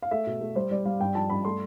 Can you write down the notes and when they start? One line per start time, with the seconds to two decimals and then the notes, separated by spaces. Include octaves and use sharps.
0.02 F5
0.11 A3 E5
0.27 B2
0.41 A3
0.55 G3 C5
0.71 G3 D5
0.85 G3 F5
1.00 G2 G5
1.15 F3 A5
1.30 G2 B5
1.45 A3 C6